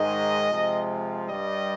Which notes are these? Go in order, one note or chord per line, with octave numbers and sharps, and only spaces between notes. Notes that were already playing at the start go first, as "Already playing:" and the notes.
Already playing: G#2 D#3 G#3 D#5
C3 F3 G#3
G2 G3 D#5